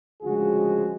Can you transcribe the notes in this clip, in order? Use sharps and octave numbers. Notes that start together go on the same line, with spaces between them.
D2 C#3 F3 G#3 F#4 G#4